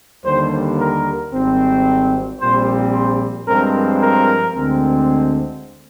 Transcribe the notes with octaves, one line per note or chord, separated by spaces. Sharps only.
D#2 D3 G3 C5
A#4
G#1 G#2 G3 C4
A#1 A#2 G3 C4 C5
C5
G2 F3 G#3 C4 A#4
A#4
D2 D3 G#3 C4